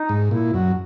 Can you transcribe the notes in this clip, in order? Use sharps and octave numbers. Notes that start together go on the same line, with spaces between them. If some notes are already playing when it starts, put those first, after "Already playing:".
Already playing: D#4
G#2
A#2 E4
F#2 F#4